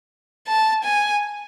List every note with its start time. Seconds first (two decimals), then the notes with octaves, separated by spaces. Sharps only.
0.47 A5
0.84 G#5